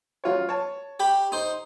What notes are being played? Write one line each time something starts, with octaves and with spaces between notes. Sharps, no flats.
F#3 F4 C#5
C#5 A5
G4 G5 B5
D#4 C5